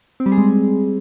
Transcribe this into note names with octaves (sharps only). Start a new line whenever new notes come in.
C4
G3
G#4
G#3